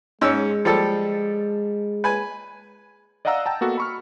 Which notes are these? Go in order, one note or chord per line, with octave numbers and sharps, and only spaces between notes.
G#2 G#3 C#4 E6
F3 G3 A4
B4 G#5
D5 D#5 F5 F#5 A#5 E6
G5 A5 A#5
A#3 B3 F#4 A4
B5 C#6 F6